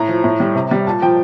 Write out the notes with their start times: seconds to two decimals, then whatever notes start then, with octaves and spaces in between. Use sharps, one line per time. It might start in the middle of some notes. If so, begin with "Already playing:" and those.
Already playing: A2 A#5
0.08 F3
0.24 A2
0.40 G3
0.55 C3
0.71 G3
0.87 A#2 A5
1.02 F3 G5